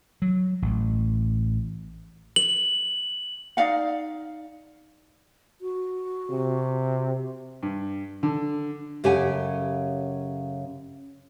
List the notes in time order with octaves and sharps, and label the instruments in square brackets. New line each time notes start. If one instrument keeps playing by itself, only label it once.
[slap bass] F#3
A1
[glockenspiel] F#7
[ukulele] D#4 D5 F5 F#5
[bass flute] F#4
[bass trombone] C3
[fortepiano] G2
D3
[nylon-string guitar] F#2 C#3 G4 A4 F#5 G#5